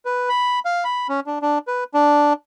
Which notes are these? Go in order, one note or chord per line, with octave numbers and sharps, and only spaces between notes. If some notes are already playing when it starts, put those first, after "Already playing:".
B4
B5
F5
B5
C#4
D4
D4
B4
D4